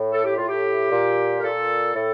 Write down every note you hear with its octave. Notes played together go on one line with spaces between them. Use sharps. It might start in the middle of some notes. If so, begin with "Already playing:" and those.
Already playing: A2
A4
G4
A2 F4
G4
A#2
A#4
A#2 A4
A2 A4